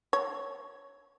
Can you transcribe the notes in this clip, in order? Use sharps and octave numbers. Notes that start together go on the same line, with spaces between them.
C#5